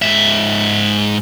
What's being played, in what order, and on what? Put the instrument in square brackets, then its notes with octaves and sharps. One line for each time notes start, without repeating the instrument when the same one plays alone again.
[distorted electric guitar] G#2 E5